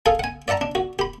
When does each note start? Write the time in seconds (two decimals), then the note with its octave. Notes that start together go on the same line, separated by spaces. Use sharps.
0.06 G#4 A4 F5
0.19 F#5 G#5
0.48 D5 E5 F#5 A5 A#5
0.61 D4
0.75 F#4
0.99 G4 B5